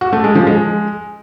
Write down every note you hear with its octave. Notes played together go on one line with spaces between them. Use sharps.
F#4
A3
G#3
F3
G#3